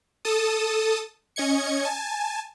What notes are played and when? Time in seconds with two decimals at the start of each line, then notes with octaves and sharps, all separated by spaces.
0.25 A4 A5 D#6
1.36 C#4 D#5 G#6 C#7
1.84 G#5 A5